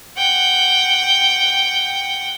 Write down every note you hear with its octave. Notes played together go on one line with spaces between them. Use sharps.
F#5 G5